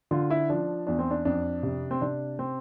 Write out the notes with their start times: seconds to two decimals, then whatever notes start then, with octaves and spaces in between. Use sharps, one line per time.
0.11 D3 F4
0.30 E4
0.50 F3 D4
0.87 E2 D4
0.99 C4
1.11 D4
1.25 F2 D4
1.63 C3
1.91 C4
2.01 C3 D4
2.39 C4